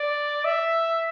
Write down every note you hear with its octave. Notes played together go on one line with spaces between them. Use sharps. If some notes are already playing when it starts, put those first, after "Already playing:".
Already playing: D5
E5